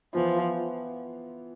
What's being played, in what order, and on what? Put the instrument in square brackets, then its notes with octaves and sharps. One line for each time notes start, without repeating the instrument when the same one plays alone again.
[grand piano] E3 B3 F4 [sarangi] F3